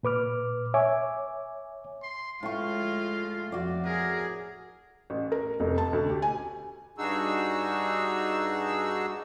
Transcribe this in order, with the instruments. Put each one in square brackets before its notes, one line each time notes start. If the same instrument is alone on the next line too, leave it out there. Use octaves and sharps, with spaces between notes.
[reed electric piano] A#2 B4 D6 F6
C#5 E5 G#5 D6
[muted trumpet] C6
[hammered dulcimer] A2 C#6 [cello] G#3 F4 [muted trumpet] F5
[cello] F2 [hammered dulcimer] F#4 D5
[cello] G#4 [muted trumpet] A#4
[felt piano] A1
A#4
F1
A5
D2
G4
G#5
[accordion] G2 D4 D#4 F#4 G#4 E6